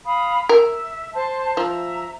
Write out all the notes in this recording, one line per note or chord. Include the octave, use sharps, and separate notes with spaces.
F5 B5 D#6
A#4 E5
C5 A5 C6
F3 E5 A#5